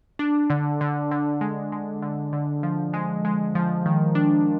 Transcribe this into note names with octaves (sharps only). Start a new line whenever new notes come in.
D4
D3
D3
D3
G#3
G#3
D3
D3
F3
G#3
G#3
F3
D#3
D4